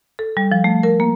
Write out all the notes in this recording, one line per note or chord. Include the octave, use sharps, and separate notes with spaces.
A4
G3
F3
A3
A#4
A#3